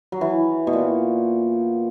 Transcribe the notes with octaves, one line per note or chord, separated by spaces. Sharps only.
F#3
E3
B2
A#2